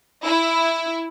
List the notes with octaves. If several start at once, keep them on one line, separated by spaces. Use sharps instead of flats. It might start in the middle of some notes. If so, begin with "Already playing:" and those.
E4